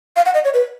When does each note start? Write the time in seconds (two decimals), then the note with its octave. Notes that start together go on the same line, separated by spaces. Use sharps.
0.16 F5
0.25 F#5
0.34 D#5
0.44 C#5
0.54 B4